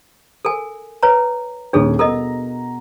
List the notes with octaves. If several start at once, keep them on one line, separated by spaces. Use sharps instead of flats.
A4 A#4 G#5
B4 C#5 A#5
D#1 D#2 D4 G#4 A4 C#5
B2 A4 A#4 D#5 A#5